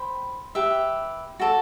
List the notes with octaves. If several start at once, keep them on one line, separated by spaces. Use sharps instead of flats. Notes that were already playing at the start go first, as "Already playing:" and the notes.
Already playing: C5 G5 B5
G4 B4 E5
F#4 A4 D5